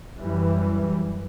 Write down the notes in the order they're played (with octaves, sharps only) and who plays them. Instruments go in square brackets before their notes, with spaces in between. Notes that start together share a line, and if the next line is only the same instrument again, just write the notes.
[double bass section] F#2 E3 G3